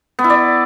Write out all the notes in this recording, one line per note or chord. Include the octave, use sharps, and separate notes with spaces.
B3
E4
D5